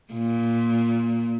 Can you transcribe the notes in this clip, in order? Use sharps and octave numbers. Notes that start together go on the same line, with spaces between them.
A#2